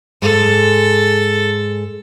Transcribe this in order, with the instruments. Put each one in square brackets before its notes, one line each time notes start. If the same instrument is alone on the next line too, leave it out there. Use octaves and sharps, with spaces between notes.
[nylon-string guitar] G#2 G#3 [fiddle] A4